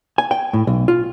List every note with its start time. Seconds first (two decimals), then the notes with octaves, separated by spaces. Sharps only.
0.18 G#5
0.31 G5
0.53 A2
0.67 B1
0.88 F4